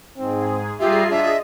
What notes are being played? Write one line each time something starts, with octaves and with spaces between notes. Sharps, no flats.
G#2 C4 G#4
G3 F4 G4 G#4 E5 A#5 C7
D4 D#5 E5